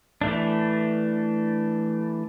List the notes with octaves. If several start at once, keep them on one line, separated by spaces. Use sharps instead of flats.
E3 A3 D4